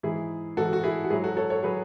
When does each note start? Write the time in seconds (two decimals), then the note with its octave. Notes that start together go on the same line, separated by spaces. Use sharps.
0.03 G#2 E3 E4 G#4
0.57 G#2 E3 F#4 A4
0.73 F#4
0.83 E4 G#4
1.04 F#4
1.10 G#2 F#3 E4 G#4
1.24 F#4 A4
1.37 A4 C#5
1.50 A4 C#5
1.63 F#3 G#4 B4